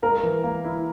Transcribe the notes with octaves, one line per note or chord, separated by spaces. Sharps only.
A#3 A#4
E3
A#3
E4